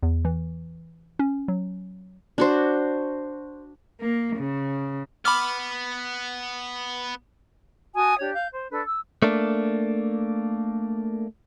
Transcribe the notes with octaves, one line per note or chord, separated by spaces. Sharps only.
E2
E3
C#4
F#3
D4 F#4 C5
A#3
C#3
B3 B5 D6 F6
F#4 G#5 A5 D#6
D4 G4 C#5
F5 G6
C5
D4 A4 B4
E6
A3 A#3 D4